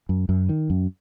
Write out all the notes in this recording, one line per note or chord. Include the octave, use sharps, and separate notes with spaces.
F#2
F#2
D#3
F#2